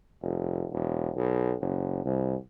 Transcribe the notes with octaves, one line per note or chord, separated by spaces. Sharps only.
F1
E1
B1
F#1
C2